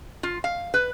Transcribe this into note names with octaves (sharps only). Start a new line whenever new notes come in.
F4
F5
B4